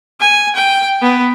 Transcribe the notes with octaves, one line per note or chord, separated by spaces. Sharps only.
G#5
G5
B3